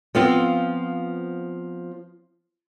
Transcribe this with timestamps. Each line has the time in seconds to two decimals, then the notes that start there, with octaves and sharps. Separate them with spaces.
0.15 F3 B3 C4 F4